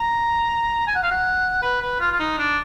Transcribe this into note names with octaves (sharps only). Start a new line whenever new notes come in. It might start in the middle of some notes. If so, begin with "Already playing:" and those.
Already playing: A#5
G#5
F#5
F5
F#5
B4
B4
F4
F4
D#4
D4